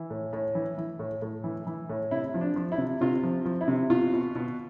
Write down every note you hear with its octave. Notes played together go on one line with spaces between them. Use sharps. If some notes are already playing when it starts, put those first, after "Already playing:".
Already playing: E3
A2
A2
E3
E3
A2
A2
E3
E3
A2
C3 E4
F3
D4
F3
E4
C3
C3 F4
F3
F3
E4
C3
B2 F4
B2
B2